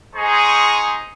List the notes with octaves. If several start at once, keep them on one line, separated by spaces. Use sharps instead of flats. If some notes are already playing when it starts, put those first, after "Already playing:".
G#3 D#4 G#4 C5 G#5 C#6